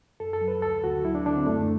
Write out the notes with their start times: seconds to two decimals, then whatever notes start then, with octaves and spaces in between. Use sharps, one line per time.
0.20 F#2 A4
0.33 A4
0.41 F#3
0.48 B4
0.62 D2 A4
0.84 D2 F#4
1.04 F#3 E4
1.15 D4
1.26 D3 D4
1.36 C4
1.47 F#2 A3